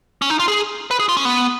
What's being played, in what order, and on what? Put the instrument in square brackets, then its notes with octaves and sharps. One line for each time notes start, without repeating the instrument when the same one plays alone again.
[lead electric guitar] C#4
D#4
F4
G#4
B4
G#4
F4
C#4
B3